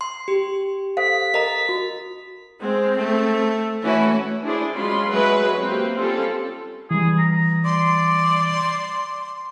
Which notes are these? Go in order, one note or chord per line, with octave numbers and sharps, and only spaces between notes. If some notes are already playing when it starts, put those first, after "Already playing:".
C6
G4
A4 C5 F5 B6
A#4 D#5 A#5
F#4
G#3 C4
A3
E3 A3 C#4 E4 F#4
D4 E4 G#4 C5 D5
F#3 G#3 C#4 F4 B5 C6
F#3 G#3 A3 F#4 B4 E5
A#3 C4 G4 C5
G3 C4 C#4 F4 A4
E3 G3 G#4
A#5
D5 C6